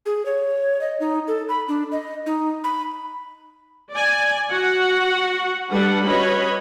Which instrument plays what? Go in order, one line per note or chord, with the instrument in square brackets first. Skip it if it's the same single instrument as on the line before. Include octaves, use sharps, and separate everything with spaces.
[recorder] G#4
C#5
D#5
D#4
A4
B5
D4
D#5
D#4
B5
[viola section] D5 G#5
F#4 F#5
G3 D4 A4 B4 F#5
C#4 F#4 B4 C#5 D#5 B5